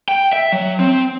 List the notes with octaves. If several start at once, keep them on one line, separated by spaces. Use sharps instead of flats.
G5
E5
F#3
C4